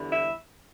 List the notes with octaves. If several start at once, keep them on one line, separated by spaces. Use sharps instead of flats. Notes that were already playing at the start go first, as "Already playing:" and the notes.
Already playing: E2 D3 G3 E4
E5